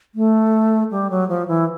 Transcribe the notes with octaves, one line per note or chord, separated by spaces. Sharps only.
A3
G3
F#3
F3
E3